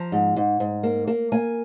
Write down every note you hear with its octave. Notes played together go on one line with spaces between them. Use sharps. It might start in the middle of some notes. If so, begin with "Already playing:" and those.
Already playing: F3 A#5
G#2
G#2
G#2
A#3
A#3
A#3 G#5